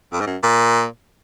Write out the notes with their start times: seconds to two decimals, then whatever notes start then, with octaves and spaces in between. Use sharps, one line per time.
0.12 F2
0.21 G#2
0.26 F#2
0.43 A#2